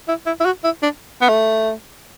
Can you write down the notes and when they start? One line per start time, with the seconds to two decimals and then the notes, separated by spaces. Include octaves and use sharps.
0.08 E4
0.26 E4
0.40 E4
0.45 F#4
0.64 E4
0.83 D4
1.21 B3
1.29 A3